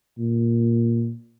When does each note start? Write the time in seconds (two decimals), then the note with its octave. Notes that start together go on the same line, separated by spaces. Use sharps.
0.18 A#2